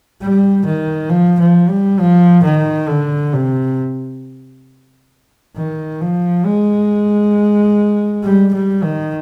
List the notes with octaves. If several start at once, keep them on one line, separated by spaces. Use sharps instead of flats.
G3
D#3
F3
F3
G3
F3
D#3
D3
C3
D#3
F3
G#3
G3
G3
D#3